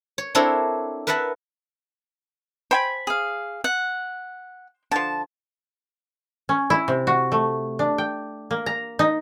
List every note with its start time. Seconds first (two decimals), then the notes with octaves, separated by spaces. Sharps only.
0.18 C#5
0.35 C4 D4 E4 A4 A#4 C#5
1.07 A#4 B4 E5 F#5 A5
2.71 C5 G5 G#5 B5
3.07 G#4 F5
3.64 F#5
4.91 D3 F3 A5
6.49 C#4
6.70 E4
6.88 C3
7.07 F#4
7.32 A3
7.79 D4
7.98 G5
8.51 A#3
8.66 A#5
8.99 D#4